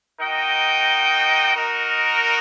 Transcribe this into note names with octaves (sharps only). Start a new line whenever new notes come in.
D#4 F#4 A#4 D#5 G5
D#4 F#4 A#4 D#5